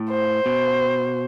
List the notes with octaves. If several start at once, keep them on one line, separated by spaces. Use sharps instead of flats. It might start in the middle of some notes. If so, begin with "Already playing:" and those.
Already playing: A2
C5
B2